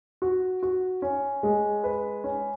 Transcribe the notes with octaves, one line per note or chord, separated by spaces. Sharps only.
F#4
F#4
C#4
G#3
B4
C#4